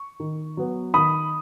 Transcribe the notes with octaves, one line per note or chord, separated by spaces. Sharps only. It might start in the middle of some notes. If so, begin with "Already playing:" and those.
Already playing: C#6
D#3
F#3 B3
D#3 B5 D#6